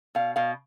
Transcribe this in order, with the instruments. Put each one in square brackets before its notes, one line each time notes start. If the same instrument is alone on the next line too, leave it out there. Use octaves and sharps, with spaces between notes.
[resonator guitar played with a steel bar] B2 F5
B2 F5